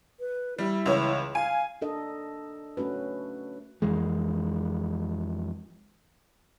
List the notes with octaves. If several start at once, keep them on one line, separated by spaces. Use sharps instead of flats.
B4
G3 E4
C#2 E3 C#5
F5 G#5
D4 A4 A#4 D#5
A3 C#4 F#4 B4
F2 E3 G#3